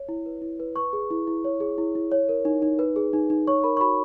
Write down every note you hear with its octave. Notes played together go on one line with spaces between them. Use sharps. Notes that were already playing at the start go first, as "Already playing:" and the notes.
Already playing: C#5
E4
B4
E4
B4
B4 C#6
G#4
E4
E4
C#5
G#4
E4
E4
C#5
A#4
D#4
D#4
B4
G#4
D#4
D#4
C#5 C#6
A#4 B5
C#6
F#4 B5